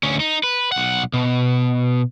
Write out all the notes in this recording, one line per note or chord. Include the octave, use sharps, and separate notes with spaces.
D2 C#4
D#4
B4
B1 F#5
B2